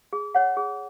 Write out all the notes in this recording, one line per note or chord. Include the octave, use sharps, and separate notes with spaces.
G#4
C#5 F#5
G#4